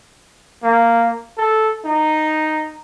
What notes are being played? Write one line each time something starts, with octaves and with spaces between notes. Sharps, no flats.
A#3
A4
D#4